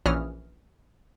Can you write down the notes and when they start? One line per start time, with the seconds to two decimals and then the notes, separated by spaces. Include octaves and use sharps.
0.06 A#1 E3 C#4 D#6 F6